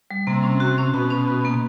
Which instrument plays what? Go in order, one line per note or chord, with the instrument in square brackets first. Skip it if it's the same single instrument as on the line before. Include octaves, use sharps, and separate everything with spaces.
[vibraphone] G3
[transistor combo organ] C3 [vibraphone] A#3
[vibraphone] C#4
F#4
C#4
[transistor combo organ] B2 [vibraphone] F#4
[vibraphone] C#4
F#4
A#3